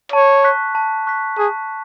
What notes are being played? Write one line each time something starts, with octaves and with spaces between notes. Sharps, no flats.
C#5 A5
C#6 F#6 B6
A5
C#6 F#6 B6
G#4 A5